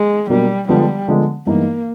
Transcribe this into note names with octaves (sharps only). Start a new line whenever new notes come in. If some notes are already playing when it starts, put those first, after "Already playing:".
Already playing: G#3
B2 F#3 G3 A#3 D4
D3 F3 G3 G#3 B3
D3 F3 G#3 B3
G2 E3 G#3 A#3 B3 D#4